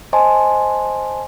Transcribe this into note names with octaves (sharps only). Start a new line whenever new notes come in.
C5 D#5 G#5 A5 C6